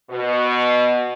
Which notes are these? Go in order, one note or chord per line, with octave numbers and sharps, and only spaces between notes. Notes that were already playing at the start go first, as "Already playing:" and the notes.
B2